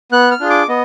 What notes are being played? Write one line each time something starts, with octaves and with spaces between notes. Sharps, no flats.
B3 F#6
F6
D4 F4 G#4
D6
B3 D#5